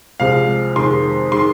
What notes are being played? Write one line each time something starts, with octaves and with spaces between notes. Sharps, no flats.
C2 C3 F3 G#3 F5
F2 C3 D#3 G#3 C6
D#3 G#3 C6